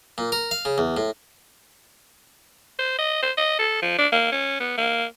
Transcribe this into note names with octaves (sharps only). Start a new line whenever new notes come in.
A#2
A#4
F5
C#3
E2
A2
C5
D#5
C5
D#5
A4
F3
D4
A#3
C#4
B3
A#3